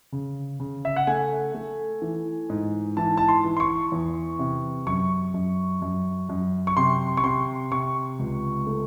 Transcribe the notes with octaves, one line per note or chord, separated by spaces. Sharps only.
C#3
C#3
E5
F#5
A3 G#5
A3
E3
G#2
E3 A5
A5
C6
E3
C6
C#6
E2
C3
F#2 C#6
F#2
F#2
F#2
C#6
C3 C6
C#6
C3 C6
C3 C#6
C#2
A3